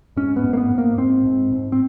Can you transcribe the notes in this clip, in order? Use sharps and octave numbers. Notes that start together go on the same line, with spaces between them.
G#2 C#4
B3
G#2
A#3
B3
G#2
A#3
G#2 C4
G#2
G#2
C4